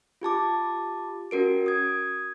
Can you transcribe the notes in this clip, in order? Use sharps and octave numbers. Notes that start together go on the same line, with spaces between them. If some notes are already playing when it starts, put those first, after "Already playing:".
F4 G4 A5 D6
C#4 F#4 A#4 D7
D#6 G#6